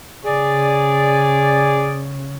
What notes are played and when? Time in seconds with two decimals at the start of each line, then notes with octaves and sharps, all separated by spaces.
0.25 C#3 G#4 D5